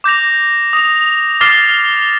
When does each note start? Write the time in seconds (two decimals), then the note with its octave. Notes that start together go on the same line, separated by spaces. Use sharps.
0.04 D6 G6 A#6 F7
0.73 D#6 A#6 F7
1.41 D6 F6 A6 C7 G7